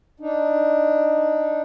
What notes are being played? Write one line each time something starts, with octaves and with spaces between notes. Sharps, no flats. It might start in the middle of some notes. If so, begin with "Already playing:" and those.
D4 D#4